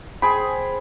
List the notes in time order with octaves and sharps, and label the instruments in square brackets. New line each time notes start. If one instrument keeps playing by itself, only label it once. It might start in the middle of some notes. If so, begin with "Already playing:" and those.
[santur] G#4 C5 G5 [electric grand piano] B5